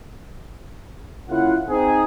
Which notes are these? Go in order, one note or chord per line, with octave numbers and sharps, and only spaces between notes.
C#3 A#3 E4 F4 F#5
C4 D#4 G#4